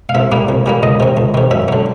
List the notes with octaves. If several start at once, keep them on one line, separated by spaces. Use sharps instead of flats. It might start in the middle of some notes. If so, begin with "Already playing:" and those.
F5
C2 E5
A#2 G3 A#3
C2
A#2 G3 A#3
C#2 D#5
C3 D#3
C#2
C3 D#3
F#2 E5
D3 F#3